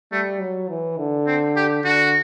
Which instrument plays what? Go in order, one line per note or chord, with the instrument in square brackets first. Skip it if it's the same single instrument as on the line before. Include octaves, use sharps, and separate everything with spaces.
[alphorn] G3 [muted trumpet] A3
[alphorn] F#3
E3
D3
[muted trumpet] C4
G4
[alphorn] D3 [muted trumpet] F#4